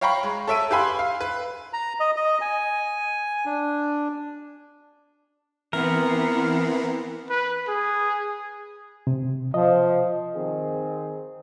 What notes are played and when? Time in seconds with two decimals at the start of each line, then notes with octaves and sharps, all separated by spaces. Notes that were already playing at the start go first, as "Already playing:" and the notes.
0.01 C#5 F5 G5 A#5 B5 C#6
0.23 G#3
0.47 A4 C#5 E5 E6 D7 D#7
0.71 G4 B4 F5 G#5 B5 C6
0.99 F5
1.21 B4
1.73 A#5
2.00 D#5
2.17 D#5
2.41 G#5
3.46 D4
5.73 E3 B3 C4 A#4
7.30 B4
7.68 G#4
9.07 C3
9.54 F3 D#5
10.35 D#3 C4 G#4